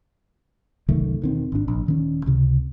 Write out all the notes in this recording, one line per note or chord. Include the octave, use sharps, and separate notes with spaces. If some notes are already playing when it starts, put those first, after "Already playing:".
C2 F#2 D#3 A3
E1 D#3 C4
G#1 D4
A#1
D#1 D#3 C#4
C#2 C3